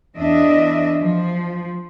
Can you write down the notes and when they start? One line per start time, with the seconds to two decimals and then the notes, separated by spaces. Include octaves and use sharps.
0.16 E2 D4 D#5 E5
1.01 F3